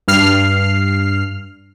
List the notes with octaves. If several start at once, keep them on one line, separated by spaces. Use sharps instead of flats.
G2 F6 C7